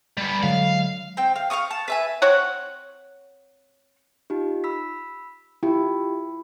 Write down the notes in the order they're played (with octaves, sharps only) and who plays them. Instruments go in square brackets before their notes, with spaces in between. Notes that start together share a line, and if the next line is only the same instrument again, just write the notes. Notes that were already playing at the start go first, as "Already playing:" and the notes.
[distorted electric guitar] G3 B3
[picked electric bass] D3 F#3 G#3 [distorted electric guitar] F5
[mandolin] C4 G5
F5
F5 A#5 C#6 D#6
A5
B4 E5 G#5
[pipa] C4 C#5 F#5
[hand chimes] D#4 F4 G4
B5 E6 B6
[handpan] E4 [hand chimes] F4 G4 G5